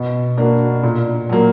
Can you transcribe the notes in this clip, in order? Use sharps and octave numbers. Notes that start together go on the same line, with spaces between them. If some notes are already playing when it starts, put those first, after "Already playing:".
Already playing: B2
A#3 D4 F#4
A#2
F#3 A#3